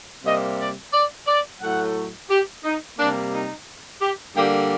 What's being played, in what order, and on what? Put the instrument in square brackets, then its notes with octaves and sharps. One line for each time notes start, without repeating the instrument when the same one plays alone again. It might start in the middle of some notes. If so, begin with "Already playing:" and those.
[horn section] C3 G3 A#3 D#5
D5
D5
D5
A2 F#3 A3 F#5
G4
D#4
C3 G3 A#3 D4
D#4
G4
D3 G3 A#3 G4